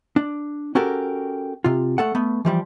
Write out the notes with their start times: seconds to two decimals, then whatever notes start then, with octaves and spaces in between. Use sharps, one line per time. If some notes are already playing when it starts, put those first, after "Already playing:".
0.16 D4
0.75 C#4 F#4 G4 A4 A#4
1.64 C3 F4
1.98 A3 A4 F#5
2.15 A3 B3
2.45 E3 F3 G3